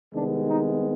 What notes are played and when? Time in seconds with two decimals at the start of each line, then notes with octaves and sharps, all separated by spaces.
0.13 C2 C3 D#3 G#3 B3 D4
0.48 D#4